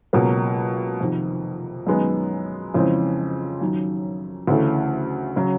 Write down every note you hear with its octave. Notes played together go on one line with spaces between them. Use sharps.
C#2 B2 F#3 A#3
F2 C3 D#3
F#2 D#3 G#3 B3
F2 C#3 E3 G#3 C4
F#2 D#3 F#3
D2 C#3 E3 A3
C#3 F#3